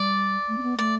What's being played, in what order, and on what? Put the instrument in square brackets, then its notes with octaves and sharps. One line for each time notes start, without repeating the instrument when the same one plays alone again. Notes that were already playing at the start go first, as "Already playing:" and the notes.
Already playing: [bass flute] G3 [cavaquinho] D5
[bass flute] A3
C4
B3
[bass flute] A3 [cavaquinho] D5